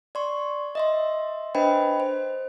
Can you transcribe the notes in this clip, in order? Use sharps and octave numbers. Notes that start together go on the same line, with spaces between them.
D5 C6 C#6
D#5 E5 C6
D4 B4 C5 D#5 G5 B5
C5